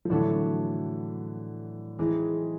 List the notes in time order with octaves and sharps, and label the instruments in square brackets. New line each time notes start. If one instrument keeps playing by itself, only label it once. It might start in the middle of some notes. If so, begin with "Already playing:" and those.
[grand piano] F3
[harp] A2 F#3 A3 D4 F#4 [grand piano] D3 E3
[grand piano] E3 [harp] G#3 C4 D#4 G#4